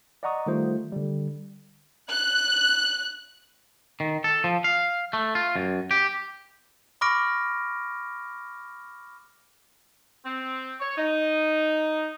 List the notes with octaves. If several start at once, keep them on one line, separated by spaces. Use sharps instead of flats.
D5 D#5 F#5 A#5 C#6 D#6
D#3 G3 A3 F4 C5
D3 G3
F#6
D#3
A4
F3
F5
A3
F4
F#2
G4
B5 C#6 D6 F6 A#6 D7
C4
C#5
D#4